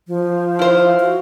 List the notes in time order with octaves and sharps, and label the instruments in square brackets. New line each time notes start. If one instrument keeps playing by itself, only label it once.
[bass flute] F3
[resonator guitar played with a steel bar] E4 C5 [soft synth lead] F5
[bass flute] F#4